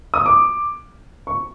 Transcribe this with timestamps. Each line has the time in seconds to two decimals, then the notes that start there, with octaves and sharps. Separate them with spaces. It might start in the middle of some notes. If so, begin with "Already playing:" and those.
0.14 D#6
0.26 D6
1.27 C#6